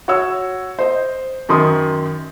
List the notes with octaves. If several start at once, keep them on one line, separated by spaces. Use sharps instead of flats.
F#4 C#5 E6
C5 D#5
F#2 D#3 C6 D#6